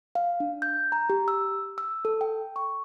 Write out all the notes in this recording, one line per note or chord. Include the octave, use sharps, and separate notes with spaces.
F5
D4
G6
A#5
G4
E6
E6
A4
G5
C#6